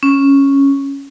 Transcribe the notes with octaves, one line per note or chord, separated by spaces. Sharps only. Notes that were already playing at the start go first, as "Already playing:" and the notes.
C#4